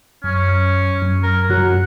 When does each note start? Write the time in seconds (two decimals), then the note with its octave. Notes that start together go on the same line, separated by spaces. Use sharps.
0.24 F#2 C#4
1.02 F#2
1.23 A#4
1.50 F#2 F#3 F#5